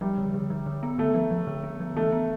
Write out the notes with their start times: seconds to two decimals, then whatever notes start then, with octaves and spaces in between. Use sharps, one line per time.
0.01 F3 G3
0.18 D3
0.34 D3
0.50 F3
0.66 D3
0.83 B3
0.98 D3 A3
1.15 F3
1.31 F3
1.47 D3
1.63 B3
1.80 F3
1.97 E3 A3
2.12 B3